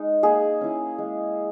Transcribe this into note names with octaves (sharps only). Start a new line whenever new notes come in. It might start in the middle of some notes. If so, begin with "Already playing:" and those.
Already playing: G#3 D#4
A#3 G#4
C#4 E4
G#3